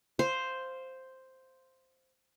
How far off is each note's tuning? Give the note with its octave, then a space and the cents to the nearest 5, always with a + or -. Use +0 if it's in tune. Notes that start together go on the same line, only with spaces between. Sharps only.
C5 +0 F5 +0